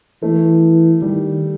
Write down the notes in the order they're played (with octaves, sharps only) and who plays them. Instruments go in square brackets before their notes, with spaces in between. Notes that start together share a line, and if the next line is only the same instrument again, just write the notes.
[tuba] E3 [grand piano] A3
[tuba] D#3 [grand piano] G3